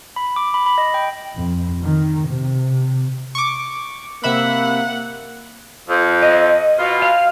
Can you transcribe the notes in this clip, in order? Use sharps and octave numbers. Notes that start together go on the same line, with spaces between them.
B5
D6
B5
B5
D#5
G5
F2
D#3
C3
C#6 D6
C3 A#3 E5 F#5 B5
F2
D#5
B2 F4
F5